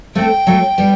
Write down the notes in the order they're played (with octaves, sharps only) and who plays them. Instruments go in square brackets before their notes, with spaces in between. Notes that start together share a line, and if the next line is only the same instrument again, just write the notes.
[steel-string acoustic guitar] A3 C4 [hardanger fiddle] G5
[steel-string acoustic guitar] F#3 A3
G3 B3